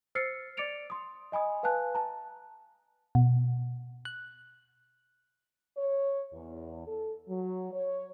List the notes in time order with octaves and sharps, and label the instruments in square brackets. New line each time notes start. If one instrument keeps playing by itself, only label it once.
[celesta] C5 E6 F6 A6 C7 C#7
D5 D6 A6 C#7 D7 F7
C6 D#6
D#5 G#5 B5 D#6
B4 F5 G#5 A5 F#6
A5 A#5
[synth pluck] B2
F#6
[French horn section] C#5
E2
A4
F#3
C#5